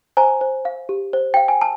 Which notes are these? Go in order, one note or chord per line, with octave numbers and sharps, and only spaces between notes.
C5 G#5 A#5
C5
F5
G4
C5
F5 G5
G#5
A5